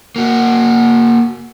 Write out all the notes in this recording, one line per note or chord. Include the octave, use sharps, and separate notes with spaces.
A#3 F#4